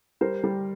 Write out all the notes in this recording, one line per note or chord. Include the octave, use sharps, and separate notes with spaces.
G3 A#4 C5
G3